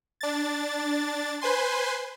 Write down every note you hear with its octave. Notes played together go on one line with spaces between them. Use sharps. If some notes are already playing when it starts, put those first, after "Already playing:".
D4 A6
B4 C5 G#5 C6